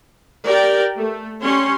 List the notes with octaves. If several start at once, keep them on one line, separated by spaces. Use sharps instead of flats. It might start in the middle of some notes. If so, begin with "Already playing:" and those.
G4 A#4 D5 G5
A3
G3 C#4 C#5 C6